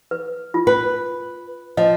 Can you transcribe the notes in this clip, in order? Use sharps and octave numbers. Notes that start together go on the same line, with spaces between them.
B4
F4
B4
F3 D#5